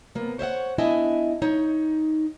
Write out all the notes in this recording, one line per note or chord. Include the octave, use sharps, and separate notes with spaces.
C3 A#3 B3
C5 C#5 E5 F#5
B3 D4 E4 D#5 E5 G#5
D#4 C#5